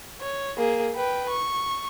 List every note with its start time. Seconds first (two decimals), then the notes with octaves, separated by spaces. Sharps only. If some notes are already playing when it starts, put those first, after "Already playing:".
0.21 C#5
0.57 A#3 G#4
0.95 B4 G5
1.29 C#6